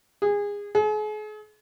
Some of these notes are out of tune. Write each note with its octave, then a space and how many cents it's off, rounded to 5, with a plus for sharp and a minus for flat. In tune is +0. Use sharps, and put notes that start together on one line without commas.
G#4 -25
G#4 +40